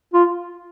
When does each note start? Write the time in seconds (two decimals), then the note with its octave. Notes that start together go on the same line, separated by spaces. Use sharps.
0.14 F4